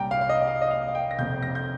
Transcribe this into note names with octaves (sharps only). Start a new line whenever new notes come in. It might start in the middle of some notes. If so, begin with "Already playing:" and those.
Already playing: C2 A#2 G3 G5 A#5
F5
F5
D#5
F5
D#5
F5
F5
G5
A#6
F1 F2 C3 G6
A#6
G6